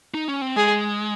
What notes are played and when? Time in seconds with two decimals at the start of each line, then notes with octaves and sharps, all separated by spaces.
0.14 D#4
0.28 C#4
0.42 C4
0.56 G#3 G#4